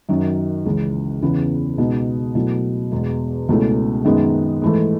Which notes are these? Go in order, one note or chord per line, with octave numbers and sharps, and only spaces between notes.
F#2 D#3 F#3
C#2 C#3 E3
E2 C#3 E3 B3
C#2 B2 G#3 D#4
B2 F#3 A3 E4
E2 B2 G#3
C#2 B2 A3 C#4 E4
F#2 D#3 G#3 B3 D#4
G#2 E3 A3